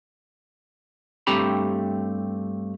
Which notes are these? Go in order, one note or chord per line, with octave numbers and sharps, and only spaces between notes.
G2 A3 C4 G4 A#5 B5